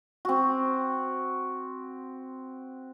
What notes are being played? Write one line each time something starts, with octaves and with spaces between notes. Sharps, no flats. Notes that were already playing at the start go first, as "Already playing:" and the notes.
C4 F#4